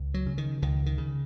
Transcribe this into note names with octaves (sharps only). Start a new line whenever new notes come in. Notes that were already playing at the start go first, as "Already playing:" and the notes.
Already playing: C#2
F#3
C#3
D#3
C#2 D#3
D#3
C#3